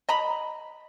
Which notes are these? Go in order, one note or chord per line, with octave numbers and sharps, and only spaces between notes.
D#5 A#5 B5